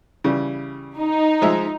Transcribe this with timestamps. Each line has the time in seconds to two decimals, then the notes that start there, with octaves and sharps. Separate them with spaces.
0.24 C#3 E3 G3
0.99 D#4
1.42 F3 G#3 E5